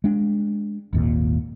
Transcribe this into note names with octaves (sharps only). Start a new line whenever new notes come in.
G#3 D4
G#1 D#2 A#2